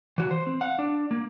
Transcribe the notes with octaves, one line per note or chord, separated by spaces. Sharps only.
E3 F#4
C5
C4
F5 F#5
D4
A#3